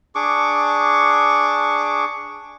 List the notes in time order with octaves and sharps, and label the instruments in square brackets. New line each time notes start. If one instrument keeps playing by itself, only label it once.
[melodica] D4 G#4 C#6 D6